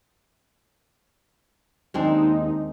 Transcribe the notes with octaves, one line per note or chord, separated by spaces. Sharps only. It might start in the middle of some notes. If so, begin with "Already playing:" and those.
D#2 G#3 C4 D4 D#4